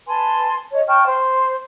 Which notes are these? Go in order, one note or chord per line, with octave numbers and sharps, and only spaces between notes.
B4 G#5 A5 C6
C#5 D#5
G5 A5 C#6 F6
C5